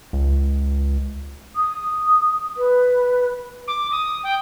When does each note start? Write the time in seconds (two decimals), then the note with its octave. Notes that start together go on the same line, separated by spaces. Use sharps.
0.13 C#2
1.56 D#6
2.57 B4
3.68 D6
3.92 D#6
4.24 G5